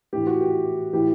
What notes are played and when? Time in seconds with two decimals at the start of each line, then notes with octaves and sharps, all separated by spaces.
0.13 A2 E3 G4
0.27 F#4
0.41 G4
0.93 A2 E3 G4